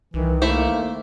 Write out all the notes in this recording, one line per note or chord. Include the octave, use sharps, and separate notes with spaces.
C2 D#3 E3
A3 A#3 E4 C5